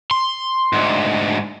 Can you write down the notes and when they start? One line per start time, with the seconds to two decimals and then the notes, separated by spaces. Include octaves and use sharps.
0.11 C6
0.73 D2 G#2